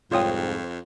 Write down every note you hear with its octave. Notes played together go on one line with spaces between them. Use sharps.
C2 F2 G#2 F4 C5 C#5 G5 D#6